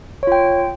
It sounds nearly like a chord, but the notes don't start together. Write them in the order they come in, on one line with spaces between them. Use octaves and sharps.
C#5 F4 G5